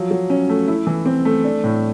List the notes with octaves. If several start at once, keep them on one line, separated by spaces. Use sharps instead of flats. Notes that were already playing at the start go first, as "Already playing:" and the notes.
Already playing: F3 F#3
F#3
C#4
A3
E4
E3
C4
A3
D4
A2